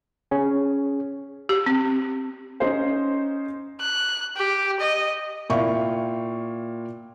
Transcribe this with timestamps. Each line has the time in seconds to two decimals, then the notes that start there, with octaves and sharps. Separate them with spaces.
0.31 C#4 G#4
1.49 G4
1.66 C4
2.60 C#4 D#4 C5
3.80 F#6
4.36 G4
4.80 D#5
5.50 A#2 E4 F5 G5 C#6